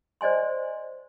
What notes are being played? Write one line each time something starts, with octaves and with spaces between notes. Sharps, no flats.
C5 D5 D#5 G#5 C6